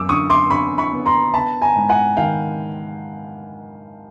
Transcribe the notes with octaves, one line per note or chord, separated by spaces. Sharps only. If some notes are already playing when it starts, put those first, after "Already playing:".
Already playing: F#2 D6 E6
D3 C#6 D#6
C6 D6
D3 B5 C#6
B5 C#6
B3
A#5 C6
B3 A5 B5
G#5 A#5
G#2
F#5 G#5
D#3 F5 G5